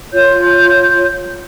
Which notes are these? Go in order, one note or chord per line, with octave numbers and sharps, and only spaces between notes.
F4 C#5 G6